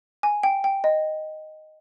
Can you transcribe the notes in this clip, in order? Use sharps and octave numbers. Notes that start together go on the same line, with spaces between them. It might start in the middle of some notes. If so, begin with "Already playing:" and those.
G#5
G5
G5
D#5